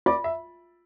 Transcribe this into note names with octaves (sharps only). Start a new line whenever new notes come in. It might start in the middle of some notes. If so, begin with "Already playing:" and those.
F4 D5
E5